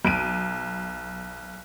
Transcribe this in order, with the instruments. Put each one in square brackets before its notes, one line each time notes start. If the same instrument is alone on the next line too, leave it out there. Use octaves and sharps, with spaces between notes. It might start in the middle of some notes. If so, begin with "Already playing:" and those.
[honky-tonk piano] B1 D7 D#7